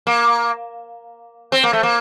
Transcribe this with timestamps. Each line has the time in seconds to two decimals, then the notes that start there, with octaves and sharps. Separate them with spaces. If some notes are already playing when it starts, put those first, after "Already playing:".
0.07 A#3
1.52 C4
1.64 A#3
1.73 A3
1.83 A#3